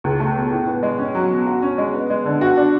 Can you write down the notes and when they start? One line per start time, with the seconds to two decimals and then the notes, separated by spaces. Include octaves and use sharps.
0.04 C#2
0.20 A3
0.36 B2
0.52 A2
0.67 B3
0.83 G#3
0.99 C#4
1.15 F#3
1.31 B2
1.46 F#4
1.62 C#4
1.78 G#3
1.94 B3
2.10 G#3
2.25 D3
2.41 F#4
2.57 D4